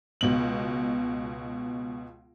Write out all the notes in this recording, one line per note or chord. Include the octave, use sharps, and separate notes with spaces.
C#2 B2 F#7